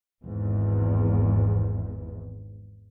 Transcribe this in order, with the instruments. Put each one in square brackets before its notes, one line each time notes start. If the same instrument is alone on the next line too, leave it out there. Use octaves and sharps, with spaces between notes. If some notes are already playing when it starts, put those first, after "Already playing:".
[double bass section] G#1 E2 G#2